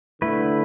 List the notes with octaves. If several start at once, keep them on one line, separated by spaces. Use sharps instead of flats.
D3 A3 E4 B4